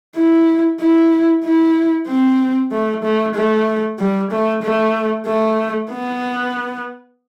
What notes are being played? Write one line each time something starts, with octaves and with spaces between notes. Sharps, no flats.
E4
E4
E4
C4
A3
A3
A3
G3
A3
A3
A3
B3